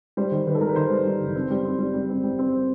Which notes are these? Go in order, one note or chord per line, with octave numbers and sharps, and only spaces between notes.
G3 C5
D#3
D#3 B4
A4
G3 A#4
B4
D#3 C5
G3
G3
F#1
C4
G3
C4
G3
G3
C4
G3
C4